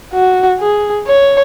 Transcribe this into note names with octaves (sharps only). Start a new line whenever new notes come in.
F#4
G#4
C#5